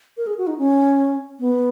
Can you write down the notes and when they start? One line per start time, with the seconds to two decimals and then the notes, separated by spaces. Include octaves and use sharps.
0.17 A#4
0.27 G#4
0.38 F#4
0.47 D#4
0.58 C#4
1.40 B3